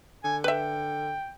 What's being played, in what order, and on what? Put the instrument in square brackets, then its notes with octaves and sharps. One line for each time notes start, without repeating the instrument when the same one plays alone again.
[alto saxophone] D3 [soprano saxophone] G#5
[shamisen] B4 E5 [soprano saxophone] G5